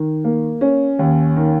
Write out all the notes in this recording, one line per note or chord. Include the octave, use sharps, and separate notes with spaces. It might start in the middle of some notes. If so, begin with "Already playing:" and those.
Already playing: D#3
A#3
C#4
D#2
D#3